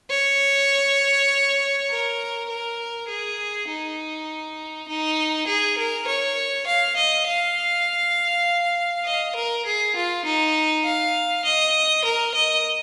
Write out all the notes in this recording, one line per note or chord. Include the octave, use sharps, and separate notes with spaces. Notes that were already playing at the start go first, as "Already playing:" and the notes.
C#5
A#4
A#4
G#4
D#4
D#4
G#4
A#4
C#5
F5
D#5
F5
D#5
A#4
G#4
F4
D#4
F5
D#5
A#4
D#5